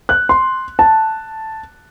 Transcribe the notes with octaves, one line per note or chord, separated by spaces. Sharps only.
F#6
C6
A5